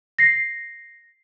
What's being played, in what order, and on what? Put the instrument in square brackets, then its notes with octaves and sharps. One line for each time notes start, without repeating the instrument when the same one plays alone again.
[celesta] A#6 C7